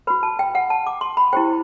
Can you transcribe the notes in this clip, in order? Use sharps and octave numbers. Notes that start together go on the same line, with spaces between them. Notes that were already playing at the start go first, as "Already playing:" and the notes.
F#4 B4 B5
A5
G5
F#5
A5
D6
C6
B5
E4 G4 C5 G5